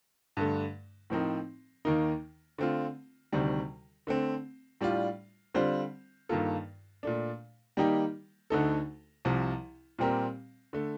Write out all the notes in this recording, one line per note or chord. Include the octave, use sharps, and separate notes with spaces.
G2 D3 A3
A2 F3 C4 D#4 A#4
D#2 D#3 A#3 D#4 A#4
D3 A3 C4 F4
D2 C3 D#3 G3
D3 A3 C4
A2 G3 D4 F4
D3 G3 C4 F4 C5
G2 D#3 A#3 F4 A4
A#2 A3 D4
D#3 G3 A#3 D#4 G4
D2 D3 A3 D#4 A4
C2 C3 F3
A#2 G3 C4 G4 A#4
D3 A3